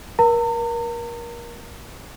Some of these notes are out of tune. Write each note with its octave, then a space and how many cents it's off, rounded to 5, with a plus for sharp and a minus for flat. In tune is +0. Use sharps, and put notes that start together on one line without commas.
A#4 +30 A#5 -40